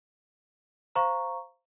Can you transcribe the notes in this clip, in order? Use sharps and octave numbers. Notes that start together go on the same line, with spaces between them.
C5 F5 A#5 C#6